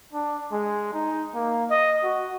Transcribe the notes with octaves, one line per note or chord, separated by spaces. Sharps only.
D4
G#3
D#4
A#3
D#5
F#4